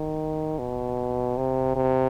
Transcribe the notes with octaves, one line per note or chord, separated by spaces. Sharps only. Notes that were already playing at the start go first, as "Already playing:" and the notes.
Already playing: D#3
B2
C3
C3